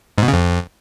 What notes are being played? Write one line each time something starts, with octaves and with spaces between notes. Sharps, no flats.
G#2
B2
C#3
F2